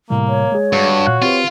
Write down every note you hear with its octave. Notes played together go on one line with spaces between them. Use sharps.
A2 C3 G3 A#3
C#5
G#3 G#4
G2 F#4
A#2 F5 F#6
C4 F4 G4 B4